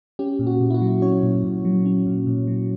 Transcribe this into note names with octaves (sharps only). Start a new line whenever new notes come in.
C#4 G4
A#2
F#4
A#2
E4
F#4
F#3
C#4 C#5
A#2
A#2
F#3
C#4
A#2
A#2
F#3